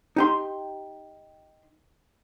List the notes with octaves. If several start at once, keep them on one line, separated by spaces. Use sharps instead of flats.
D#4 G4 C6